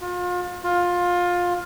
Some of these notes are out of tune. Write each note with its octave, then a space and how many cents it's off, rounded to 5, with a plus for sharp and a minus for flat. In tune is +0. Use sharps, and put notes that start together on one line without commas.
F4 +35
F4 +20